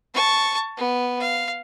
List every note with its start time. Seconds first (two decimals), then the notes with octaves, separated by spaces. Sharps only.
0.14 A5 C#6
0.77 B3
1.20 F5